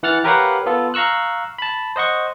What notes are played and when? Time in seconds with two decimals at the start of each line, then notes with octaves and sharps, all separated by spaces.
0.03 E3 F#5 F6 A6 C#7
0.24 G4 A#4 B4 C#5 F5 F#5
0.66 B3 F4 A4
0.94 F5 A#5 C#6 E6 F#6
1.58 A5 B5
1.96 C5 D#5 F#5 C#6